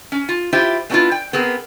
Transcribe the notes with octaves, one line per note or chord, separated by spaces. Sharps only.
C#4
F4
E4 F4 G4 C5 E5
G#3 A3 B3 D4 E4 F4
G5
B3 C4 G#4 A#4